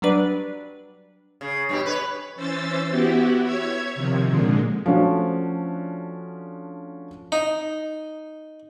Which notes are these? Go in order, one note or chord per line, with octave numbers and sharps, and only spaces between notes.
F#3 G3 D4 B4 D5
C#3
G2 B2 G4
B4 C#5
E3 C#4 C5 E6 A6
B3 E4 F#4 G4
C#5 E5 G#6
C3 D#3 F3
A#2 D3 G#3
F3 A3 C#4 D4 F#4
D#4